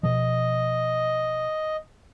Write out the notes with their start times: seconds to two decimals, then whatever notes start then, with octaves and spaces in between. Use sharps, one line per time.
0.03 B2 F3 D#5